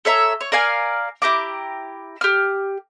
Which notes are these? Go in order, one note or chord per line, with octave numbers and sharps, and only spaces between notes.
A4 C#5 E5 A#5
C#5
A#4 D5 F5 G#5
E4 G4 A#5 D6
G4 F6